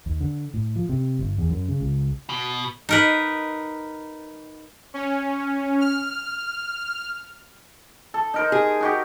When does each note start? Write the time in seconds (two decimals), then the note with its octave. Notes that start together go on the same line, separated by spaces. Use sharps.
0.06 D#2
0.20 D3
0.54 A2
0.76 F3
0.89 C3
1.19 G1
1.38 E2
1.50 F#2
1.68 C#3
1.80 C#2
2.29 B2
2.89 D#4 A#4 B4
4.94 C#4
5.81 F6
8.14 A4
8.34 D#4 A#4 C5
8.52 G#4
8.80 D#4 F#4 G4